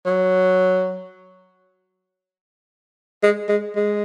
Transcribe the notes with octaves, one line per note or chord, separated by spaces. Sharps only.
F#3
G#3
G#3
G#3